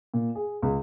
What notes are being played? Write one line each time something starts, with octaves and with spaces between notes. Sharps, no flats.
A#2
G#4
C#2